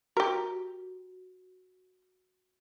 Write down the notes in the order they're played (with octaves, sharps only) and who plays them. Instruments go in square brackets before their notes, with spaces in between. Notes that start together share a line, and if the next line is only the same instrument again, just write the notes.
[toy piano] F#4 [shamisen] G4 A#4